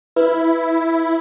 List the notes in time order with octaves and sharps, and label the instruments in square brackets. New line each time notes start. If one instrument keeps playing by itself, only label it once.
[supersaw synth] E4 [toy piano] B4